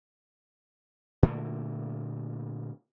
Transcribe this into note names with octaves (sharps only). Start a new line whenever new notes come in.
A#2 D3 A3 A#3